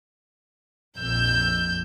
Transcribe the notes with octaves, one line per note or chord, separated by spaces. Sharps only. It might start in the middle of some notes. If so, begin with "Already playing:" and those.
A#1 F2 E6 G6